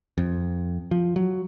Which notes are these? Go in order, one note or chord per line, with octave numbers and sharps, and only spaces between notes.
F2
F3
F#3